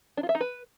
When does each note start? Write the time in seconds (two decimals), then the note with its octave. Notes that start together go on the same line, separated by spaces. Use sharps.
0.17 D4
0.23 F4
0.29 E5
0.35 D#4
0.41 B4